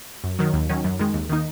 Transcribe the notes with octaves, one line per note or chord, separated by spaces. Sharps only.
F#2
D#3 F#3
D#2
D#3 F#3 C#4
F#2
D#3 G#3
D#2
D#3 A#3 D#4